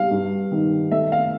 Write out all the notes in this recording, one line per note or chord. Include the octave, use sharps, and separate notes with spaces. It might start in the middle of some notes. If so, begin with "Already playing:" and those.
Already playing: G3 F5
G2
D#3
A3 E5
F5